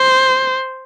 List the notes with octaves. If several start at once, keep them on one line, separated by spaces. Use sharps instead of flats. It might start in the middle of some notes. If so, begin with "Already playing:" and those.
Already playing: C5